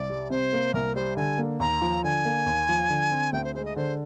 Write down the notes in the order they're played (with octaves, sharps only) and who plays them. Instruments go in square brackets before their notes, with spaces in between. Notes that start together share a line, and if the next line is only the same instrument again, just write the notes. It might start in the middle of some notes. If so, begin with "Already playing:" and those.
Already playing: [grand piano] C2 [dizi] D5
[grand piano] G3
[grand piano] C3 [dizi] C5
[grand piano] A#3
[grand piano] C2 [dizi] A#4
[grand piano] G3 [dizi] C5
[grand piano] D3 [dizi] G#5
[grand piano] A#3
[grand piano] D#2 [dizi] A#5
[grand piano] F3
[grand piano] D3 [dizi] G#5
[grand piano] A#3
D#2
F3
D3
C4
[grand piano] D2 [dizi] G5
[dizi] C5
[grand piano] G#3 [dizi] C5
[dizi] D#5
[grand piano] D3 [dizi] C5